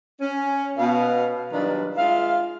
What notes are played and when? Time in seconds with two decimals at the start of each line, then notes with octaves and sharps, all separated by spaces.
0.21 C#4
0.77 B2 F5
1.52 D#3 F#3 G3 D4 F4 B4
1.96 G#3 F4 E5 F5